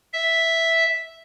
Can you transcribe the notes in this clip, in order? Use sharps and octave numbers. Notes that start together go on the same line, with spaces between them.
E5